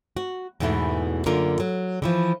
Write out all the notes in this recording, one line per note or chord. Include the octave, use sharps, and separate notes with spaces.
F#4
E2 G#2 B2 E3 A3
F#2 D3 A#3 F4 A#4
F#3
D3 E3 F3